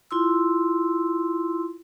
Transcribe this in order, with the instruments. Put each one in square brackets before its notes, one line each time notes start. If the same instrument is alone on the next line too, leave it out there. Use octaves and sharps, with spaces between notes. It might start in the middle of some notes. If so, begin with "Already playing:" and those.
[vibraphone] E4 F4 C6 E6